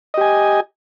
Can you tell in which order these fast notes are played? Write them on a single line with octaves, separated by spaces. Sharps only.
D#5 G4 G#5